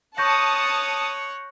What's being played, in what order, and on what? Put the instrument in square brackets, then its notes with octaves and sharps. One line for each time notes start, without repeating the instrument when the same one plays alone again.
[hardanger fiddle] C#5 F#5 [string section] A5 D#6 [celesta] C#6 G6 A#6